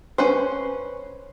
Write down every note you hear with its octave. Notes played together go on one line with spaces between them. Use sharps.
C#4 B4 C5